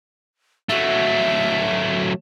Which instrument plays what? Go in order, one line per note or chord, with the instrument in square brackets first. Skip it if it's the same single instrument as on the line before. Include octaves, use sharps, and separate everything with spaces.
[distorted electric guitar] F#3 A3 [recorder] E5